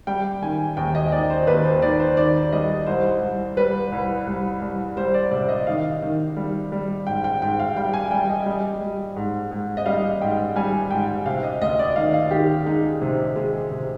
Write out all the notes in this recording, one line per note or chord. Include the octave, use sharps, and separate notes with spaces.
G3 G5
D#3 G#5
D#2 G5
D#5
D#3 D5
C5
D#2 B4
C5
D#3 D5
C5
D#3 D5
G3 D#5
C2 C5
C2
G3 B4
C2
C2
C2
G3 C5
D5
C3 D5
D#5
D#3 F5
D#3
G3
G3
G#2 G5
G5
G#2 G5
F5
G3 G5
G#5
G3 G5
D#5
G3
G3
G#2
G#2
D#5
G3 F5
G#2 G5
G3 G#5
G#2 G5
C3 F5
D#5
D2 D#5
D5
D#3 F5
F5
D#3 G4
G#3 D#4
C3
G#3
C3